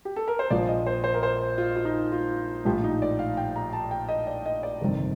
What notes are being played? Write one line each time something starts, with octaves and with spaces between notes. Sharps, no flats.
G4
A4
A#4
C5
A#1 A#2 F3 D5
D#5
C5
C5
A#4
C5
F4
F4
D#4
F4
A#1 A2 F3 G4
D#4
D5
F5
G5
A#5
A5
G5
D#5
D5
D#5
D5
G1 F2 C3 D#3 G3